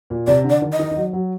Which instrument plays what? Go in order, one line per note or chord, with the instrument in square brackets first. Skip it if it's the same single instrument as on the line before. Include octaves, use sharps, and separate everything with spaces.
[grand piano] A#2
[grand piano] C3 [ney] D5
[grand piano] D3
[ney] D5
[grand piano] D#3
[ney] D#5
[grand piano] D#3
D#3
F#3
F#3